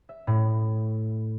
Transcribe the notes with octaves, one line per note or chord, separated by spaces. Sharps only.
E5
A2